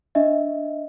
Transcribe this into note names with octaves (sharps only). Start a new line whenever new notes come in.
D4 D#5 E5